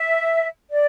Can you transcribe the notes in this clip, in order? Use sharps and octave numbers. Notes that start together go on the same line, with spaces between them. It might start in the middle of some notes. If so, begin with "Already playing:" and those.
Already playing: E5
D5